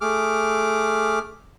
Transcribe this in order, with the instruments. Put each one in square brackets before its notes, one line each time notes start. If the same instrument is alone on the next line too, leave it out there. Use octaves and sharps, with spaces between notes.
[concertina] A3 G#4 D6 F6